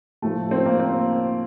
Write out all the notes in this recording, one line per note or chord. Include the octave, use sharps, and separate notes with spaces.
A2 F3 A3
C4
A#3
C4